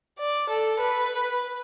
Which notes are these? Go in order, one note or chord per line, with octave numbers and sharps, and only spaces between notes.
D5
A4
B4